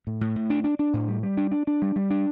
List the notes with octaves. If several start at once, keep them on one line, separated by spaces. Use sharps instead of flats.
A2
A2
A2
D4
D4
D4
A2
G3
G3
D4
D4
D4
G3
G3
D4